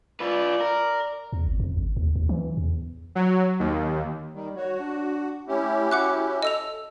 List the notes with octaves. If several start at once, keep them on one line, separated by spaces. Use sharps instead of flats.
F4 B4 D5
A#4
E2
G1
F2
G#1
D#2
D#2
E3
E2
F#3
D#2
D#3 G3
F#4 C#5
D4
A3 C#4 E4 G4
F#4 F#5 D6 F#6
A4 D#5 E6 F7